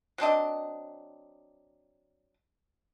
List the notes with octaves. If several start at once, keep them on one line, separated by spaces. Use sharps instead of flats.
F#3 C4 D4 D#5